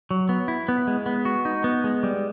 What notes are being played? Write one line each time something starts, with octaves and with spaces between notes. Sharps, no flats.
F#3
B3
E4
B3
G#3
B3
F#4
D#4
B3
G#3
G3